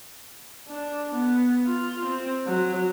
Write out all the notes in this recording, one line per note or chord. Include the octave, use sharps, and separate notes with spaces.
D4
B3
F4
C4
F#3